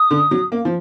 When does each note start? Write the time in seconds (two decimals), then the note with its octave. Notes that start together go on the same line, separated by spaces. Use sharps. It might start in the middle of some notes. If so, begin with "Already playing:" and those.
Already playing: D#6
0.11 D3
0.31 F#3
0.52 A#3
0.65 F3